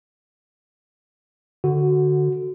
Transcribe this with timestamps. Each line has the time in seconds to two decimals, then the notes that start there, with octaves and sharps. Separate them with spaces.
1.64 D3 F#4